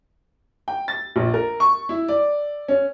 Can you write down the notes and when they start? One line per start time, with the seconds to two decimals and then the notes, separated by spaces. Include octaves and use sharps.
0.68 G5
0.88 A6
1.16 A#1
1.34 A#4
1.60 C#6
1.89 E4
2.08 D5
2.68 C#4